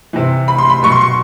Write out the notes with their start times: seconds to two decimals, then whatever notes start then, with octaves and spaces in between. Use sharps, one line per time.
0.13 C3 E3
0.48 B5
0.58 C6
0.70 B5
0.83 B2 F#3 C#6
0.92 C6
1.01 C#6